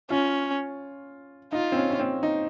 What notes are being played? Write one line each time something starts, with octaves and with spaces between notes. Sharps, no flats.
C#4 F4
D#4 F4
C4
C#4
C#4
C4
D#4